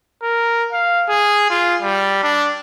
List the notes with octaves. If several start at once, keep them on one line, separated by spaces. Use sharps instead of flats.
A#4
F5
G#4
F4
G3
D4